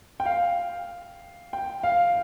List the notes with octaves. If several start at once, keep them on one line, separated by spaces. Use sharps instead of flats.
G5
F5
G5
F5